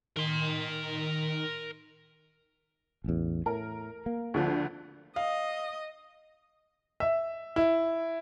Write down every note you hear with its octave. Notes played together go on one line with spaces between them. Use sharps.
D#3 A#4 C6
A1 E2
A2 A#4
A#3
D2 D3 F3
D#5 F5
E5
E4